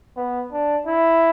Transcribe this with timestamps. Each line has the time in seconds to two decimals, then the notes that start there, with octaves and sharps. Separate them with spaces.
0.17 B3
0.52 D4
0.87 E4